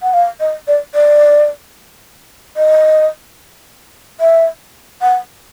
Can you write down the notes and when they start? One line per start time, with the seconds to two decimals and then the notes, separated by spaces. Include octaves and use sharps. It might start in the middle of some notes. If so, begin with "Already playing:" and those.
0.02 F#5
0.14 F5
0.40 D#5
0.68 D5
0.95 D5
2.57 D#5
4.20 E5
5.02 F#5